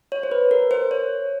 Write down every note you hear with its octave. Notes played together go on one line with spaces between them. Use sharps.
C#5
C5
B4
A#4
C5
C#5